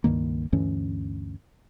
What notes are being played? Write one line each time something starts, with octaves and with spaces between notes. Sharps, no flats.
C#2 G2 D#3 A#3
D2 G2 E3 C#4